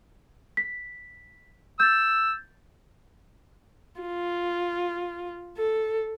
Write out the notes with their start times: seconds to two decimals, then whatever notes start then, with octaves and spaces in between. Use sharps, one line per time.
0.57 B6
1.80 E6 G6 A6
4.01 F4
5.58 A4